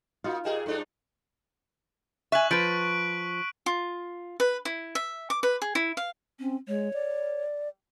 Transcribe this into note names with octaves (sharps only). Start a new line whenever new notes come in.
A#3 D#4 F4 F#4 D#5 F5
A#2 G4 G#4 A#4 D#5 G5 E7
G2 D4 D#4 A4
E5 G#5 C#6 F#6 F#7
F3 B4 B6 D7
F4
B4
E4
E5
D6
B4
G#4
E4
F5
C4 C#4
G#3 C#5
D5